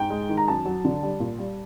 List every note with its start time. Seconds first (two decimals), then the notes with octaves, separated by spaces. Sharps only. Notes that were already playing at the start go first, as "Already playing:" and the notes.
Already playing: G#2 G5
0.10 G#3
0.29 D#3
0.37 A#5
0.48 F#2 A5
0.65 F#3
0.85 D3
1.03 G3
1.20 A#2
1.38 G3